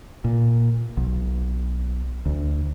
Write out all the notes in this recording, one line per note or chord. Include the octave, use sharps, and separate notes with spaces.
A#2
B1
D2